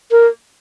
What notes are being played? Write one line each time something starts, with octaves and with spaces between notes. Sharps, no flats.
A#4